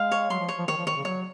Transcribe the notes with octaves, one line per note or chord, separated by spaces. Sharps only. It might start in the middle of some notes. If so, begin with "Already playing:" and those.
Already playing: G#3 F5
C#5
F#3 C6
F3
C#5
F3
D#3 C#5
F3
D#3 C#5
C#3
F#3 C#5